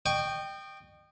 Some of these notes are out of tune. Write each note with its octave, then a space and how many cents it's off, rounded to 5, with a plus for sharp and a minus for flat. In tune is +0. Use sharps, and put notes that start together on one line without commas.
D#5 -35 G5 +0 C#6 +15